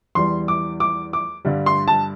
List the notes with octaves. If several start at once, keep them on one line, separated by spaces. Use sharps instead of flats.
E2 E3 G3 C6
D6
D6
D6
G2 D3 G3
C6
A5